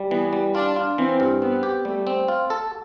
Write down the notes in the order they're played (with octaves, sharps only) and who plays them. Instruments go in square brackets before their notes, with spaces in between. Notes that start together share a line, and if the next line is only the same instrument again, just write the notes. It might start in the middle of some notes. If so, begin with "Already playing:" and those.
Already playing: [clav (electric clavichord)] G3
[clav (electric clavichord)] E3 [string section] B3
[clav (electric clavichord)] G3
[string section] D4 [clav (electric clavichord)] F4
[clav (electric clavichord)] F4
[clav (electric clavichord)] E3 [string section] C4
[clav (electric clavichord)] G2
[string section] B3 [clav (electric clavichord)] C4
[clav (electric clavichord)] G4
[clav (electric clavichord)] G3 [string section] A3
[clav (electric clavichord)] C4
F4
A4